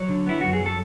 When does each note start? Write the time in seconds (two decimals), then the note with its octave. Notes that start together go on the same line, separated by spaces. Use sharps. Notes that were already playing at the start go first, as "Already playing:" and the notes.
Already playing: F#3 C#5
0.09 D3
0.26 B3 E4
0.41 F#2 F#4
0.53 G#4
0.60 F#3
0.66 A4